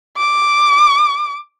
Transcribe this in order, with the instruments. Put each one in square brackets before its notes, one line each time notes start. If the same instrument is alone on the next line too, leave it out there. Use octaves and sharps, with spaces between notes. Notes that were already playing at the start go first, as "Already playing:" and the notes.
[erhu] D6